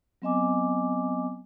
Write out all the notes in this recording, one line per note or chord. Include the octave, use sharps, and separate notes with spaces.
F#3 B3 C4 D#5 G#5 D6